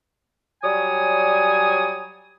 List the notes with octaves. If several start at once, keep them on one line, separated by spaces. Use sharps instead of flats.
F#3 G3 C#5 D5 G#5 D#6